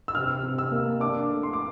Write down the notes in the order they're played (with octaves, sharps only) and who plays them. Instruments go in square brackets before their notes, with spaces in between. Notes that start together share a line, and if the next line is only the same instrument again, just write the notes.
[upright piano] E6
C3 F6
C3
E6
A#3
D4 D6
A3
C6
D6